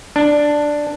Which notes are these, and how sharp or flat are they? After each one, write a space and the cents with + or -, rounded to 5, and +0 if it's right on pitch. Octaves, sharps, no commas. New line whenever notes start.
D4 +5